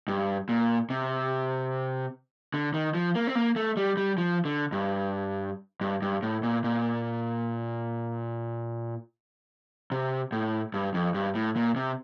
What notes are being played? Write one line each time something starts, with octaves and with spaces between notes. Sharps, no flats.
G2
A#2
C3
D3
D#3
F3
A#3
C4
A#3
A3
G3
G3
F3
D3
G2
G2
G2
A2
A#2
A#2
C3
A2
G2
F2
G2
A2
A#2
C3